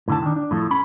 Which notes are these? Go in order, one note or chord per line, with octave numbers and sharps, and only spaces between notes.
A2 D3 A5
D#3 D4
D4
A2 F3 A4
C#4 B5